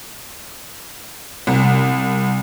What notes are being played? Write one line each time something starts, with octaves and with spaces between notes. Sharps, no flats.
C2